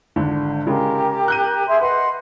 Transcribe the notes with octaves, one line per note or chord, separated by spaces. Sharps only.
G#1 D3
C#3 G#3 G4 A#4
F#6 G6 D#7
G#4 E5 C6
B4 D#5 F#5 C6